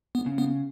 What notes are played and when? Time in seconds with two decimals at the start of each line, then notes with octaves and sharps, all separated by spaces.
0.15 B3
0.26 C#3
0.38 B3